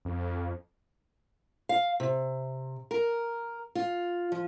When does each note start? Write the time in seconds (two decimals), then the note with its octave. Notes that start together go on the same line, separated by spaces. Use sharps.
0.05 F2
1.69 F5
2.00 C3
2.91 A#4
3.75 F4
4.32 F3